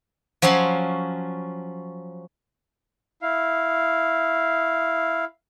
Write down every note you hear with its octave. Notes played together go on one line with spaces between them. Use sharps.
F3 F#3 C#4 F5 C6
E4 F5